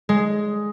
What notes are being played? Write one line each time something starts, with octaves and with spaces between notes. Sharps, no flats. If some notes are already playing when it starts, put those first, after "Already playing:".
G#3